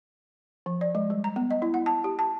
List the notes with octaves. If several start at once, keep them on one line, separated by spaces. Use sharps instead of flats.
F3
D5
G#3
G3
A#5
B3
D#5
E4
F#5
A5
G4
A5